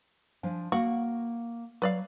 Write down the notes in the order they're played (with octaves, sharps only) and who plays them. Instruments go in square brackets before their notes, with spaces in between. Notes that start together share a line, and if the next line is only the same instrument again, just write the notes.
[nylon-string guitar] F3 D4 G#5
[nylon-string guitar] A#3 [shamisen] F#4
[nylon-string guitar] F#3 [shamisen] B4 D5 F5